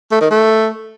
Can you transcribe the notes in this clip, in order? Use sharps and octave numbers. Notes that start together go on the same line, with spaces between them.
A3
D#3
A3